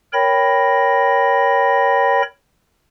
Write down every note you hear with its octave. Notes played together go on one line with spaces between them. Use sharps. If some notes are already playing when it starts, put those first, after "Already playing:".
A#4 C#5 G5 B5 A#6